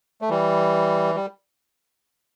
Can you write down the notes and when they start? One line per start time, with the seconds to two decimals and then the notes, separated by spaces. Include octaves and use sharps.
0.22 A3
0.29 E3 G3
1.15 G3